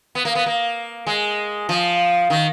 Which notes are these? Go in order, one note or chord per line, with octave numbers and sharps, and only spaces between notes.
B3
A#3
B3
A#3
G#3
F3
D#3